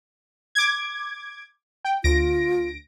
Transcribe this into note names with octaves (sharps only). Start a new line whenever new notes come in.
D6 G#6
G5
D2 F4 A#6 D7